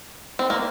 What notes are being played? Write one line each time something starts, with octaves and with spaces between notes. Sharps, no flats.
C4
A#3